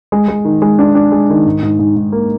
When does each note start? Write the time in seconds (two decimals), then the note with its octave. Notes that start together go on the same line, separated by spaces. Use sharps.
0.12 G#3
0.28 G#3
0.45 D#3
0.62 G#3
0.79 D4
0.95 D4
1.12 G#3
1.30 D#3
1.46 G#2
1.62 G#2
1.79 G#2
1.96 G#2
2.12 A#3